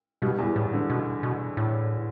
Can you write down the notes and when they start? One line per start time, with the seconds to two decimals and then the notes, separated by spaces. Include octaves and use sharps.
0.22 G2 B2 G3
0.38 E2 E3
0.56 A2
0.73 D3
0.90 B2
1.23 B2
1.57 A2